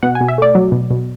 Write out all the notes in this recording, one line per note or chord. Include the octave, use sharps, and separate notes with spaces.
B2 F#5
G#5
B2
E5
A3 D5
F#3
B2
B2